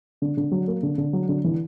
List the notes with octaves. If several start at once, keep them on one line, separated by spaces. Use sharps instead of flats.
D3
D3
F#3
A#3
D3
D3
F#3
D3
E3